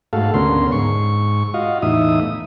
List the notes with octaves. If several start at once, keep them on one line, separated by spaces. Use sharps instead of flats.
G#2 A3 F#4 A4 F5
D2 D3 B3 C#4 A#4 C6
G#2 C#6
F4 F#4 D#5 F5
E2 A2 D#4 E5 D#6